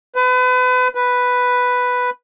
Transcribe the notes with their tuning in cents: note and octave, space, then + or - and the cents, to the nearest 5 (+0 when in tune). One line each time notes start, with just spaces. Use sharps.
B4 +35
B4 +0